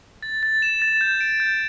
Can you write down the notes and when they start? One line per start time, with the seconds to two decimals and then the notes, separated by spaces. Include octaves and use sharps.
0.23 A6
0.43 A6
0.62 E7
0.82 A6
1.01 G6
1.21 D7
1.40 G6